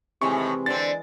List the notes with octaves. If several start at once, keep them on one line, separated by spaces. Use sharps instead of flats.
A2 C3 D#3 E3 G#3 E4 C#6
D3 C4 A6